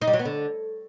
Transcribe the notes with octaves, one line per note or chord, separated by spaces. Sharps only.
D#4
G3
F#3
B3
D3